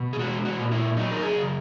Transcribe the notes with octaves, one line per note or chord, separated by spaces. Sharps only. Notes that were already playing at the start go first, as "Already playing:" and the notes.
Already playing: B2
G#4
G#3 F#4
F#4
A#2
E4
F#3 D#4
A#4
G#4
C#3